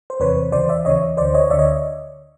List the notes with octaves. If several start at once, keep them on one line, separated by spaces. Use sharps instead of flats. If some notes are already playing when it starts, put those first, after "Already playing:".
C5
E2 C3 E3 B4 C#5
D#2 C#3 E3 C5 D5
D5 E5
D#2 C#3 E3 C#5 D#5
D2 D3 C5 D5
C#5 D#5
D2 D3 D5 E5
C#5 D#5